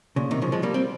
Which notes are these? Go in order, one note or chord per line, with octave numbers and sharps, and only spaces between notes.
A#2 C#3
C3 D#3
C#3 F3
F3 G#3
G3 A#3
C4